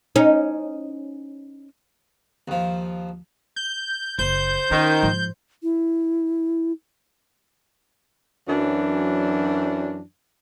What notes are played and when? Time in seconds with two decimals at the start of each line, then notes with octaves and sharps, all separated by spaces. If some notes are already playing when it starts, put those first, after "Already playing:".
0.16 C#4 D#4
2.48 D#2 F3
3.56 G6
4.19 F#1 C5 G6
4.71 D#3 C#4 F4
5.03 G#2 F3
5.63 E4
8.47 F#2 E3 F#3 D4